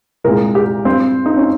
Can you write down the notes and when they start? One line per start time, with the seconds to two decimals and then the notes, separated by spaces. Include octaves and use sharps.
0.24 C2 A#2 G#3 A#4
0.55 G4
0.85 G2 G3 C4
1.26 D#4
1.37 C#4